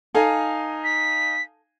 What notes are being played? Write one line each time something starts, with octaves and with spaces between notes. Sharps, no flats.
D#4 A4 F5 G#5
B6